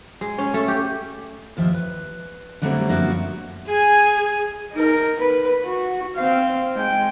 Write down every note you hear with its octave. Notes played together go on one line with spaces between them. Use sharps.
G#3
C#4
A3
G4
D#2 F3 E5
B4
D3 F#3 G3 A3 A#3 C4
F#2 F3 A#3 D4 F#4 E5
G#4 G#5
D#4 A#4
B4
F#4
C4 F5
G#3 G5